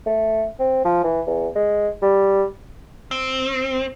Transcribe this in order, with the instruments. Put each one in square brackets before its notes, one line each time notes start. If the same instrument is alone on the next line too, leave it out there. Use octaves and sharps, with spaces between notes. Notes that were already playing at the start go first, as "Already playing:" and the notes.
[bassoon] A3
C4
F3
E3
E2
G#3
G3
[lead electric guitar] C4